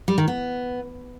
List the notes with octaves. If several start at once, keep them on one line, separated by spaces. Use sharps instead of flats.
G3
D#3
B3